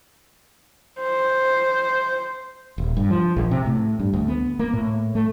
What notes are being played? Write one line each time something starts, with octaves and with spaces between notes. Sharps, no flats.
C5
D#1
G2
F3
A#1
C3
A2
G2
D2
B3
A#3
A2
A3